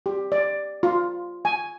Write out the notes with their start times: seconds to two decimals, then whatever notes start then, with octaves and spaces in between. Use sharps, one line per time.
0.06 G4
0.32 D5
0.83 F4
1.45 G#5